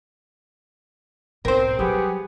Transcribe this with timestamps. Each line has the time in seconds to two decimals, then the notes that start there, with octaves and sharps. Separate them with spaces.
1.45 B1 G#2 C4 A#4 C5
1.79 F#3 G3 B3 G4 G#4